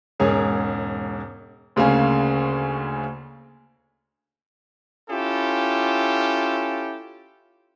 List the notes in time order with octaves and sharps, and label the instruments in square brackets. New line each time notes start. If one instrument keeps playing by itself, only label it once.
[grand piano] E1 G#2 C#4 G#4 A#4
D2 C#3 A#3 C#4
[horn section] C#4 E4 F4 G4 A4